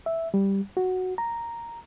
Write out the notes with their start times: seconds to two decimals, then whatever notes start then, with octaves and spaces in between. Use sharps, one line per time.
0.06 E5
0.34 G3
0.77 F#4
1.18 A#5